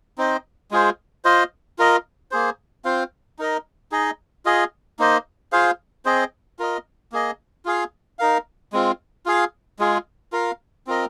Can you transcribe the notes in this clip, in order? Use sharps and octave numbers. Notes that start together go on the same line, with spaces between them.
C4 D#4 C5 D#5
G#3 F4 G#4 C5
F4 C5 D#5
F4 A#4 D#5
A#3 G#4 C5
C4 F4 C5 F5
D#4 A#4 D#5
D#4 G#4 D#5
F4 G#4 D#5
A#3 D#4 C5 D#5
F4 G#4 C5 F5
C4 G#4 C5 D#5
F4 A#4 D#5
A#3 G#4 D#5
F4 G#4 F5
D#4 A#4 F5
G#3 C4 F4
F4 G#4 F5
G#3 F4 G#4
F4 A#4 F5
C4 F4 A#4 D#5